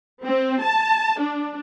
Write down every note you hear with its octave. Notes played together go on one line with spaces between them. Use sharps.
C4
A5
D4